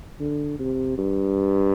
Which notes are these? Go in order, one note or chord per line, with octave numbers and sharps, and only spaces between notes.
D3
C3
G2